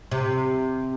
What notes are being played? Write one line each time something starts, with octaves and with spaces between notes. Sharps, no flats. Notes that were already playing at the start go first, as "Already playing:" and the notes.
C3